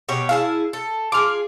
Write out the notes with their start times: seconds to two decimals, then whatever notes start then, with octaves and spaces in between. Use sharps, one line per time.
0.09 B2 G4 C#5
0.29 E4 G#4 F5 A5
0.73 A4
1.12 F4 G#4 D6 F6